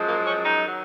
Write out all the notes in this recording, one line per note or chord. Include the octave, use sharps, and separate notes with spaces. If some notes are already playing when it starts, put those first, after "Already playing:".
Already playing: F#2 F3 G#3
A#3
C#4
D#4
D#3 F#3